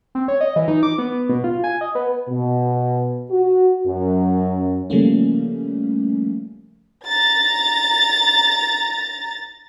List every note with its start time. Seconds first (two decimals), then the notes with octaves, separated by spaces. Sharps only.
0.15 C4
0.28 C#5
0.41 D#5
0.56 E3
0.68 D#4
0.83 D6
0.98 B3
1.29 B2
1.44 F4
1.64 G#5
1.81 D#5
1.95 B3
2.29 B2
3.31 F#4
3.86 F#2
4.90 C#3 F3 G3 A3 A#3 C#4
7.05 A#5 A6